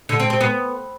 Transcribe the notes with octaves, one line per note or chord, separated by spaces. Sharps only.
D3
C4
C4
B3